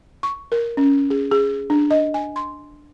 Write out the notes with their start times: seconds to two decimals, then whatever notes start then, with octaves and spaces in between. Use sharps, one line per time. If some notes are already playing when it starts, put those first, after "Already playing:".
0.23 C#6
0.52 A#4
0.77 C#4
1.10 G#4
1.31 G#4
1.70 D4
1.91 D#5
2.14 G#5
2.36 C6